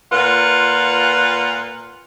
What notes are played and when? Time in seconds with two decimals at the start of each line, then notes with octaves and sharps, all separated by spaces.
0.11 A#2 F4 B4 F#5